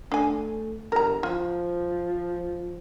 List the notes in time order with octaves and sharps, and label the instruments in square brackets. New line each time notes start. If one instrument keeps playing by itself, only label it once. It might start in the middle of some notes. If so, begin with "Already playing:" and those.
[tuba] A3 [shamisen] D4 G#5
[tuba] G1 [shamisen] A#4 A#5
[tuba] F3 [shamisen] F4